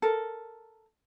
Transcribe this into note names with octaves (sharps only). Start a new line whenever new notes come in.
A4 A#4